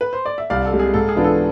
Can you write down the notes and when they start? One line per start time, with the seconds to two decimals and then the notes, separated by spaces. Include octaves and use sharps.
0.01 B4
0.13 C5
0.26 D5
0.38 E5
0.50 C2 D5 F5
0.65 A4
0.73 C3 G#3
0.80 G#4
0.94 G#2 A4
1.09 G#4
1.16 E3 B3 D4 F4
1.24 A4